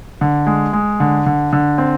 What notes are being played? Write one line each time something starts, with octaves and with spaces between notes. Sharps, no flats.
D3
G#3
G#3
D3
D3
D3
C4